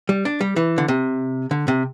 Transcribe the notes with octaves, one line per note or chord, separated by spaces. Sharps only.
G3
D4
G3
E3
D3
C3
D3
C3